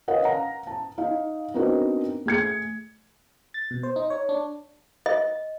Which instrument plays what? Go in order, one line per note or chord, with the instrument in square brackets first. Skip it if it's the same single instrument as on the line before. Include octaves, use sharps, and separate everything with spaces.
[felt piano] A#4 B4 C#5 D#5 F5 F#5
F5 F#5 A#5
A5
D#4 F5
B3 C4 D4 D#4 F#4 A#4
A3 G#4 G#6 C#7
[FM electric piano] A6
B2
C5
D#4
C#5
D4
[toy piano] D#5